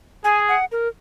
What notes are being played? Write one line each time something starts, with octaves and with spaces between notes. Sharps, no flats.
G#4 G#5
F#5
A#4